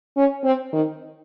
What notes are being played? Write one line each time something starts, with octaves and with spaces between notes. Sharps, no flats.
C#4
C4
D#3